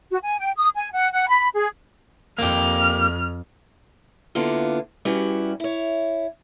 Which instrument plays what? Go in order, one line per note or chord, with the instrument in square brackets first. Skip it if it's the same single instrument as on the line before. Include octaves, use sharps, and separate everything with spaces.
[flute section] F#4
G#5
G5
D#6
G#5
F#5
F#5
B5
G#4
[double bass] F2 [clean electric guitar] A#3 G4 [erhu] F6
[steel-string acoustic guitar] D3 A#3 B3 E4 F4
G3 C#4 E4 F#4 G4 B4
E4 C#5